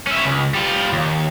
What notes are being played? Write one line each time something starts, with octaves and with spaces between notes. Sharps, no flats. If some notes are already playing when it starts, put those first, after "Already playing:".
C#4 E4
C#2
G3 F4
D#2